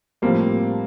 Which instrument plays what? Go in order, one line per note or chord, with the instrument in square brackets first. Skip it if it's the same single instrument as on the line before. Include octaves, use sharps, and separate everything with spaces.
[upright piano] A2 F3 C4 [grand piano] G3 A#3